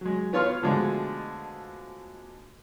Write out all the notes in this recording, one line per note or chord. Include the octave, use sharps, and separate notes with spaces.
F#3 G#3
B3 F4 C#5 C6 F6
B2 D3 F3 G#3 A3